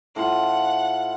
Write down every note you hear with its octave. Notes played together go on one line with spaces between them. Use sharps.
A2 F4 F#5